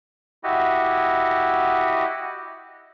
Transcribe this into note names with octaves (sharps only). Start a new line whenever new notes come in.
E4 F#4 G4 D#5